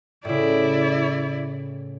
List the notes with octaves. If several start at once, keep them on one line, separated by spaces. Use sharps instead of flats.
A2 C#3 E4 D5